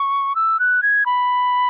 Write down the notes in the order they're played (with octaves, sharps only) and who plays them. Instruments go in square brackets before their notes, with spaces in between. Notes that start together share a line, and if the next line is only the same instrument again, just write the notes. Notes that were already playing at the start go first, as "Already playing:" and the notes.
Already playing: [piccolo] C#6
E6
F#6
G#6
B5